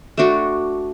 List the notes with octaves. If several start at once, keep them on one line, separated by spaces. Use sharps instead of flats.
A3 D4 F#4